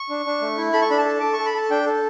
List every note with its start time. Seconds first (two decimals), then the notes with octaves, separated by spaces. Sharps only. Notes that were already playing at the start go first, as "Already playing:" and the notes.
Already playing: C#6
0.09 D4
0.26 D4
0.42 A3
0.57 E4
0.73 A4 B5
0.82 C#6
0.90 D4 B5
0.98 A5
1.05 A4
1.20 A4 D6
1.33 C#6
1.39 A4
1.46 B5
1.54 A4 A5
1.70 D4 G5
1.86 A4